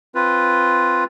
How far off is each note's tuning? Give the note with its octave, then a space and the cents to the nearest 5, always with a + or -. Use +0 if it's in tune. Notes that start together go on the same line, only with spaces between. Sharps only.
C4 +0 F4 +0 B4 +0